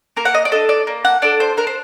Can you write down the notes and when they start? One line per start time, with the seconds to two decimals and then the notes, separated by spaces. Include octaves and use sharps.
0.17 A#3 A#4
0.25 F#5
0.35 D#5
0.45 D5
0.52 D4 A4 D#5
0.69 D5
0.87 A#3
1.05 F#5
1.22 D4 A4 D5
1.40 C5
1.57 D4 A#4
1.67 C5